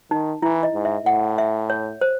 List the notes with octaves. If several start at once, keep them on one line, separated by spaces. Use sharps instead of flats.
D#3 D#4
E3 E4
D#5
G#2
E5
A2 F#5
E5
C#5
C5